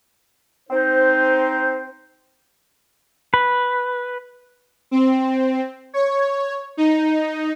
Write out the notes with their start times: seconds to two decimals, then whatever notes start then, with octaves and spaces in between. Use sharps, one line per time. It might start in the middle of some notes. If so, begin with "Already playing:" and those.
0.70 C4 D#4 C5
3.34 B4
4.91 C4
5.94 C#5
6.77 D#4